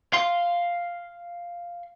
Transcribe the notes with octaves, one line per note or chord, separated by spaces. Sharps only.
F5 C6